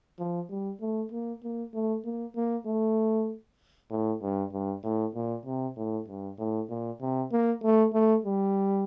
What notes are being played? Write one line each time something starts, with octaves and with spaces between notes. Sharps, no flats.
F3
G3
A3
A#3
A#3
A3
A#3
A#3
A3
A2
G2
G2
A2
A#2
C3
A2
G2
A2
A#2
C3
A#3
A3
A3
G3